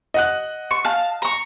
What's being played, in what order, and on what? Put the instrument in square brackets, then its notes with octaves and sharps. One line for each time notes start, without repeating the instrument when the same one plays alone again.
[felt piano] D#5 F#5 F#6
[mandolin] C#6
F5 A5
A#5 C#6